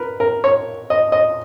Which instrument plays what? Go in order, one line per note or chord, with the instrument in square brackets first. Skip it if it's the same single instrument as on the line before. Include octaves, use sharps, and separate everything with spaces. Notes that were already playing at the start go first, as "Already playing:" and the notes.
Already playing: [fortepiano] A#4 B4
A#4
C#5
D#5
D#5